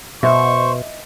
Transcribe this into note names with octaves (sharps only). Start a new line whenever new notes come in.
B2 C5 D#5 E5 C#6